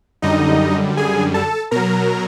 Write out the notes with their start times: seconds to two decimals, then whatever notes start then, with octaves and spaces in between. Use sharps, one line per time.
0.22 F#2 D3 G3 D#4 D#5
0.97 G#4 G#5
1.34 A4 A5
1.71 B2 F#3 A#4 A#5